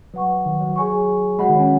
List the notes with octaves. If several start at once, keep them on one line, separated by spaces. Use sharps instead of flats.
F#3 B4 F#5 C#6
D#3
F#3
G#4 C#5 G#5 C#6
G#3 F#4 C#5 F#5 B5
D#3
C#4